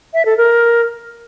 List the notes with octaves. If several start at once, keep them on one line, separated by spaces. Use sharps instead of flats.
E5
A4
A#4